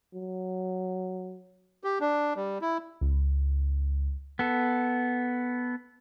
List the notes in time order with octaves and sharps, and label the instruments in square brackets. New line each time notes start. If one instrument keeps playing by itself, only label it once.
[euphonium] F#3
[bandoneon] G4
D4
G3
E4
[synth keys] C#2
[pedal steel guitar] B3 A4